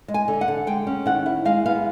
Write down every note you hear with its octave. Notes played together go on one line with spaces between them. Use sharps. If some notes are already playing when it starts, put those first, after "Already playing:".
G#3
G#5
D3
F#5
D3
G#3 G5
C#4
D#3 F#5
E4
G#3 F5
B3 F5